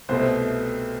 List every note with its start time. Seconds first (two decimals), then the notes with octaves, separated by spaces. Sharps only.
0.09 C2 B2 A3 C5